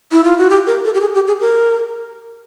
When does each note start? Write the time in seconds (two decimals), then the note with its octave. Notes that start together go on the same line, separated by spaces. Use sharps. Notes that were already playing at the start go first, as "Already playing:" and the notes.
0.12 E4
0.24 F4
0.38 F#4
0.50 G4
0.67 A#4
0.85 A4
0.94 G4
1.01 G#4
1.15 G4
1.28 G#4
1.40 A#4